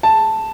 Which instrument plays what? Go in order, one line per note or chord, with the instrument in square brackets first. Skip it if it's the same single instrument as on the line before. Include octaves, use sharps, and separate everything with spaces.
[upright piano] A5